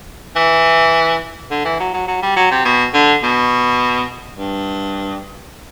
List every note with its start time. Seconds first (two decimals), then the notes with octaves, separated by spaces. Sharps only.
0.36 E3
1.51 D3
1.65 E3
1.80 F#3
1.94 F#3
2.08 F#3
2.23 G3
2.37 F#3
2.51 C3
2.65 B2
2.94 D3
3.23 B2
4.37 G2